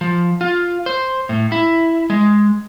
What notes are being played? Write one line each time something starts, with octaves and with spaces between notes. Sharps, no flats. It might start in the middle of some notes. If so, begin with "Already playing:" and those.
F3
F4
C5
A2
E4
G#3